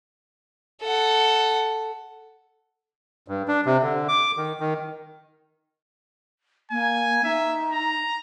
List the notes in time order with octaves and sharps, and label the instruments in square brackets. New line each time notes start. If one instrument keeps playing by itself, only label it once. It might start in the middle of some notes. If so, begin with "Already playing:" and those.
[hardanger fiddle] A4 F#5
[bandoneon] G2
D4
C3
D3
D6
D#3
D#3
[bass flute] A#3 [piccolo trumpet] G#5
[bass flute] D#4 [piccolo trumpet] E5
[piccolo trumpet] A#5